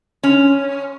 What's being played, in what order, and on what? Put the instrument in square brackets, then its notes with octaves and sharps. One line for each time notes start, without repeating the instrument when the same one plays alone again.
[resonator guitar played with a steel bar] C#4